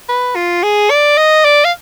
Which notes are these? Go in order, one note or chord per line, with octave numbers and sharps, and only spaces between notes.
B4
F4
G#4
D5
D#5
D5
F5